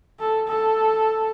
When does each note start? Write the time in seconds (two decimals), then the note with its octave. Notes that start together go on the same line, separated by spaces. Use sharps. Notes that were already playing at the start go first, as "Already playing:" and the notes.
0.19 A4
0.48 A4